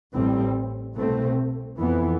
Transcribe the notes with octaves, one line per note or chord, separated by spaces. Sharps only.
A1 A2 G3 C4
C2 B2 A3 C4
F2 E3 B3